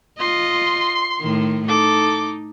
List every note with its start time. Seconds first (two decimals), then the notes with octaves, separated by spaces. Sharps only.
0.19 F4 D#5 C6
1.20 A2 D#3
1.68 D#4 A4 D6